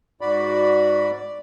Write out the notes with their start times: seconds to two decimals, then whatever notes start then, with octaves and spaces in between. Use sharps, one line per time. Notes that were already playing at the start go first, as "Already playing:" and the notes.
0.21 G#2 F#4 D5 B5
1.12 D5